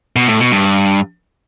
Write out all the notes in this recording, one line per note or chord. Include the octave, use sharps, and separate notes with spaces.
B2
A2
B2
G2